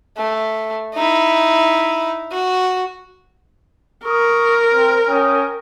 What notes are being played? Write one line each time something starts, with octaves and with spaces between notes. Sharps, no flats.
A3
D#4 E4
F#4
A#4 C#6 D#6
C4
C#4 G5 D#6